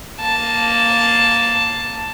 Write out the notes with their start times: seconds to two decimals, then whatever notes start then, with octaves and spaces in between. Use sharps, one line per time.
0.20 A#3 A5